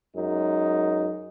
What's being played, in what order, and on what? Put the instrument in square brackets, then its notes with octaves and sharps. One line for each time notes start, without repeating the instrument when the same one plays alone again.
[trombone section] F#2 G#3 D#4